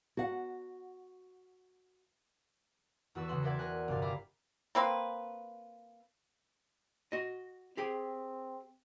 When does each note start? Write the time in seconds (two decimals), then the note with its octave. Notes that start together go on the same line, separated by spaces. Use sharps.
0.17 F#4 F#5
3.15 E2 F#4 A4 B4 E6
3.28 C#3 G#3 C#4 F#5 C6
3.43 A#4 C5 D5 E5 F#5 G#6
3.59 A#4 G#5 F#6
3.88 G1 C3 G4 F5 G#5 A6
4.02 E5 F5 A#5 B5 D6
4.75 A#3 C4 B4
7.12 F#4 D#5
7.77 C4 G4 G#4 G5